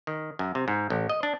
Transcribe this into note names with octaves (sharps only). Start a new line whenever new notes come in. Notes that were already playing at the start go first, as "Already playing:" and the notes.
D#3
F#2
C3
G#2
A1
D#5
D4